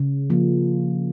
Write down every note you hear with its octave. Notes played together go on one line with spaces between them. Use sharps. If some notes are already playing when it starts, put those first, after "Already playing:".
Already playing: C#3
F3 A#3